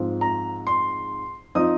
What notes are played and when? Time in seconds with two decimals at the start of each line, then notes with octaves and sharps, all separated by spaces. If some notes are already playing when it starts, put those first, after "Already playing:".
Already playing: G#2 F3 C4
0.21 A#5
0.67 C6
1.55 F3 C4 D#4 D#6